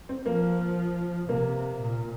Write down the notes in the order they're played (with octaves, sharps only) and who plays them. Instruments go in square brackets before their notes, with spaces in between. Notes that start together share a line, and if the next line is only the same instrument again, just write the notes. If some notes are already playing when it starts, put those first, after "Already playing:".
[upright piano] C4
[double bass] F3 [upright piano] A#3
[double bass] C3 [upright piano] A#3
[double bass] A#2